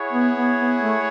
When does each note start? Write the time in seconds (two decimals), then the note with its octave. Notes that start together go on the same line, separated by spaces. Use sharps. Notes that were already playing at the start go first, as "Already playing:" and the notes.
Already playing: E4 G#4 C#5 F#5
0.13 B3
0.36 B3
0.59 B3
0.82 A3